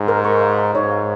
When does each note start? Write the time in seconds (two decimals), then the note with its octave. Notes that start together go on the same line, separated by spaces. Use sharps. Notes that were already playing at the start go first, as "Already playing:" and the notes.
Already playing: G#2 A#5
0.08 A#4
0.25 C#6
0.41 F5
0.59 A#5
0.74 G#2 C#5
0.91 F5